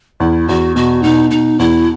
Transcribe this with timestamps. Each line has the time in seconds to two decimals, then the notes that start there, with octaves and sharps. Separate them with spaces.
0.20 E2 E4
0.48 E2 F#4
0.75 B2 F#4
1.03 B2 D#4
1.31 B2 D#4
1.59 E2 E4